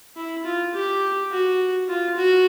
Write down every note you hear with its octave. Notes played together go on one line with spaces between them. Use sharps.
E4
F4
G4
F#4
F4
F#4